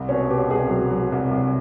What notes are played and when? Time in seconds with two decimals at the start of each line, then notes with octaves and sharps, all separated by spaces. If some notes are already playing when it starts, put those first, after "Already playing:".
Already playing: C2
0.09 B2 C#4
0.30 B2 G4
0.50 C2 G#4
0.70 F#3
0.91 F#3
1.12 C2
1.31 C2